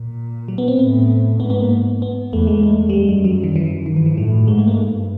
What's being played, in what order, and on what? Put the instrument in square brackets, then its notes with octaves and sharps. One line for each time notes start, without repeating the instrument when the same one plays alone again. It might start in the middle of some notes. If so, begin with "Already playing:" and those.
Already playing: [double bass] A#2
[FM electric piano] F#3
B3
C4
[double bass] A2 [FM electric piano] B3
[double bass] G#2 [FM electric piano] B3
[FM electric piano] B3
A#3
B3
[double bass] E2 [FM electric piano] A3
[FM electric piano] G#3
A3
G3
[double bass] F#2 [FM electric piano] G#3
[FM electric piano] G3
F#3
D#3
E3
[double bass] G2 [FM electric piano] D#3
[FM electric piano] E3
F3
[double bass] A2 [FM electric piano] F#3
[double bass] G#2 [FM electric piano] G#3
[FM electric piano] A3
A#3
[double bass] G2